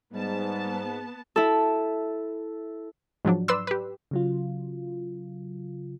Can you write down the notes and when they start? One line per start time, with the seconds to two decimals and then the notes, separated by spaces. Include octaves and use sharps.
0.13 G#2 G3 B3 A5
1.36 E4 A4
3.25 G#2 F3 F#3 D4
3.48 B4 D5 C6 E6
3.67 G4 B4
4.11 C#3 F#3 F4